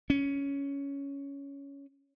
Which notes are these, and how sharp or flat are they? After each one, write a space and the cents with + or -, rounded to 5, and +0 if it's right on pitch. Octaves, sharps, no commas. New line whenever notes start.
C#4 +10